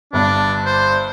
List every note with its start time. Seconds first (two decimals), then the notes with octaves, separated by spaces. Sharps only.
0.13 G1 G2 D4
0.65 C5